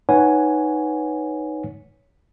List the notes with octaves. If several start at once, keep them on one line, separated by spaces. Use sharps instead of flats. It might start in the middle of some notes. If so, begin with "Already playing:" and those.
D#4 B4 C#5 F#5 G#5